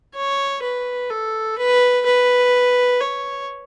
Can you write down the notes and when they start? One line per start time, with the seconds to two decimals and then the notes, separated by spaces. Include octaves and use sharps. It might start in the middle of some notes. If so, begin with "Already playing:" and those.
0.15 C#5
0.63 B4
1.10 A4
1.58 B4
2.05 B4
3.00 C#5